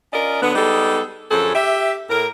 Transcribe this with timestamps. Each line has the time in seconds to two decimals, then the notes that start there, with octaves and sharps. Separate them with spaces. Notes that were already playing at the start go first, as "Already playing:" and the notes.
0.13 C#4 F4 A#4 D5 D#5
0.42 D3 F#3 B3
0.55 G3 G#3 B3 D#4 A4
1.30 F#2 D3 F3 G#4 A4
1.55 G4 E5
2.10 A2 A#4